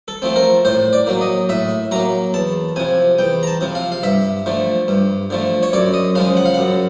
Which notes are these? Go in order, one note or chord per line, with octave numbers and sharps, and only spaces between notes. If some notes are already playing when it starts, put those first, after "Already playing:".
A4
F3 A3 C4
A#4
A2 C5
D5
F#3 A#3
D#5
A2 E5
F#3 A#3 A#5
E2 A5
C3 F3 G#5
E2 G5
A#5
A5
C3 F3
F5
F5
G2 E5
D3 F3 A3
G2
D3 F3 A3
C#5
F#2 D5
D#5
C#3 F3 G#3 F5
F#5
F5
F#2 F#5